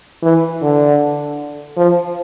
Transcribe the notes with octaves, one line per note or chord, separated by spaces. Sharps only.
E3
D3
F3